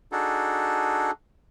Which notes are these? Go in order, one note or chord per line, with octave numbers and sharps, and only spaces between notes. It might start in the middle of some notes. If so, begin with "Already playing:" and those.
D4 D#4 F#4 G#4 A4